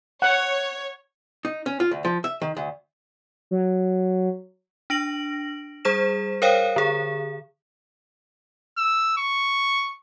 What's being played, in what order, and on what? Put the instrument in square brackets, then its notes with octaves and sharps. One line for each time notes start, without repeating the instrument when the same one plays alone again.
[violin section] C#5 [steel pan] F#5
[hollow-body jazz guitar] D#4
C#4
F4
D2
F3
E5
D#3
D2
[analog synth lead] F#3
[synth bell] D4 A#6 D7 F#7
G3 G#4 C5 B6 E7
A#4 C5 C#5 F5 G5
D3 G#4
[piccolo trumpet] E6
C#6